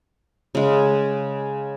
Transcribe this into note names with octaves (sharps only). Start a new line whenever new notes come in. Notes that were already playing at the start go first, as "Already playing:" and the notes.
C#3 G#3